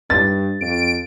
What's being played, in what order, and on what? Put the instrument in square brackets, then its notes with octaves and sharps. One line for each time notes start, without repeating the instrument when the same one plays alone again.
[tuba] G2 [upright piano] A6
[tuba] F2 [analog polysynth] D7